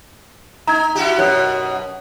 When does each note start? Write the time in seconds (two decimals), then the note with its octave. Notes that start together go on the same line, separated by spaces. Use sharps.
0.67 D#4 A#5 G#6
0.95 E4 F#4 G4
1.18 F#2 B2 C#5 F#6